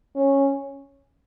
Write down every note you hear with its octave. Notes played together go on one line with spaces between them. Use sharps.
C#4